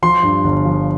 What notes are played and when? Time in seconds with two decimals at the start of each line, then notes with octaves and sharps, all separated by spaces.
0.02 F3 C6
0.23 G2
0.44 G1
0.65 F3